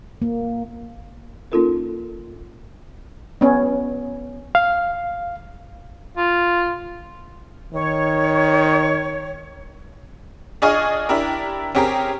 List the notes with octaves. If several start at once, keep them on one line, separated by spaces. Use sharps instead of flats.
A#3
A#3 C#4 D#4 F4 A4 A#4
B3 C#4
F5
F4
D#3 C#5
D4 F4 G#4 D#5 G#5 C#6
D4 E4 G4 A#4
C4 C#4 G4 G#4 A#4